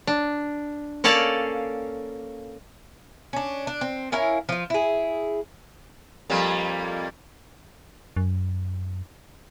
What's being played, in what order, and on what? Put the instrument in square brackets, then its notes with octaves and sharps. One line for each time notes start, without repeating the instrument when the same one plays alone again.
[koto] D4
A#3 C#4 A4 D5 F5
[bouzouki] C#4 D4
D4
C4
C#4 E4 A#4 F5
F3 F4
E4 G#4
[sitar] F2 G3 A#3
[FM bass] F#2